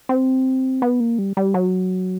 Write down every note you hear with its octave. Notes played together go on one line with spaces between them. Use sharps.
C4
B3
A#3
G3
G3
F#3